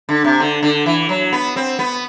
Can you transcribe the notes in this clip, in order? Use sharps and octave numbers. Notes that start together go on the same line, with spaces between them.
D3
C3
D3
D3
E3
F#3
B3
C4
B3